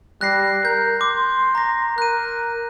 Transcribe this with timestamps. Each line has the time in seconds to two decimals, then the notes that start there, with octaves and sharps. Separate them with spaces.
0.21 G3 F#6 A#6 C7
0.65 A#4 G6
1.01 C6 D6
1.55 A#5 A#6
1.98 A#4 F#6 D#7